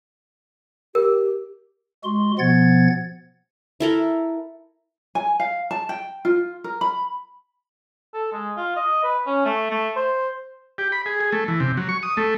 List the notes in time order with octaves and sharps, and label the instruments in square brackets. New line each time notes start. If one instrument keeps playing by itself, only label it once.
[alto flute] G4 [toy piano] A#4
[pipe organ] G#3 F#4 C6
B2 F3 B3 F#5 G#6 A6
[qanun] E4 A4 A#4
[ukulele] G#5
F5
A5
G5
F4
A#4
B5
[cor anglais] A4
G#3
F4
D#5
B4
C#4
A3
A3
C5
[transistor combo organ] G4
B5
G#4
G#4
A3
E3
C3
F#3
C#6
D#6
A3